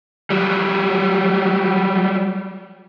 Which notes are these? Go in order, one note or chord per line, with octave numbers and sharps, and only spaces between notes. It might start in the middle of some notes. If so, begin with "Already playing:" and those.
F#3 G3